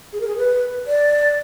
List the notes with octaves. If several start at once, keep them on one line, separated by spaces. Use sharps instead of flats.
G#4
A#4
G#4
B4
D5